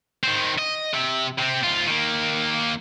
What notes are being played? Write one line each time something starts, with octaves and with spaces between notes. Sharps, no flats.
D#3 C4
D#5
C3
C3 C4
G#2 F4
D#3 A#3